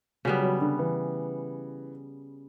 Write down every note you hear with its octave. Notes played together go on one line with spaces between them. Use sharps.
C#3 F#3 G3 B3
F#3
D3
E3